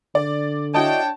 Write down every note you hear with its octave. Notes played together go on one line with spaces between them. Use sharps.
D3 D5
D4 E4 F#4 C#5 D#5 G5 A5